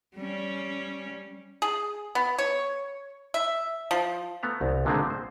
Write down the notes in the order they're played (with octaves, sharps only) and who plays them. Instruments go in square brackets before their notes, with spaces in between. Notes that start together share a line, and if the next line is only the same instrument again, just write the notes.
[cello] G3 C#4
[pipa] G#4
B3
C#5
E5
F3
[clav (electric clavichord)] A3 B3 E5 A#5
C2
A#2 D3 D#3 G#3 A3 C4
C5